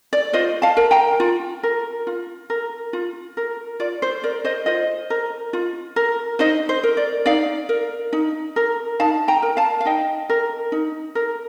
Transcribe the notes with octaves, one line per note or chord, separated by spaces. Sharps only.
D5
F4 C5 D#5
F5 A5
A#4
G5 A#5
F4
A#4
F4
A#4
F4
A#4
F4 D5
C5
A#4 D5
C5 D#5
F4 C5 D#5
A#4
F4
A#4
D#4 C5 D#5
C5
A#4
D5
D#4 D5 F5
A#4
D#4
A#4
D#4 F5 A5
G5 A#5
A#4
F5 A5
F5
D#4 D#5 G5
A#4
D#4
A#4